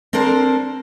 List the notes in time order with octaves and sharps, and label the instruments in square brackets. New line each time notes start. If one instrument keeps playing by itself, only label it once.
[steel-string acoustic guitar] C4 D4 A4 A#4 C5